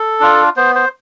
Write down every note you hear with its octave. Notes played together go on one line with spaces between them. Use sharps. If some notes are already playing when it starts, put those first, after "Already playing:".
Already playing: A4
D4 F4
B3 C5
C5